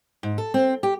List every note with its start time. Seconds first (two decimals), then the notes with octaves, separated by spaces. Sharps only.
0.23 G#2
0.38 A4
0.54 C4
0.83 G4